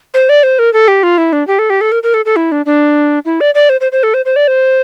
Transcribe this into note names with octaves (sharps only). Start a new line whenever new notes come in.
C5
D5
C5
A#4
A4
G4
F4
E4
D4
G4
A4
G4
A4
A#4
A#4
A4
A4
E4
D4
D4
E4
D5
D5
C5
C5
C5
A4
C5
C5
D5
C5